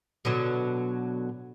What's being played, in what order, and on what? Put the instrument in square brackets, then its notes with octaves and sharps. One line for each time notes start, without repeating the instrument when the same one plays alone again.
[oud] B2 D3 F#3